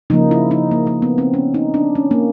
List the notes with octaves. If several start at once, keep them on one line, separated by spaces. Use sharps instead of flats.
C#3 F3 A#3 D#4
E4
D#4
A#3
A#3
B3
C4
C#4
D#4
D4
C#4
A#3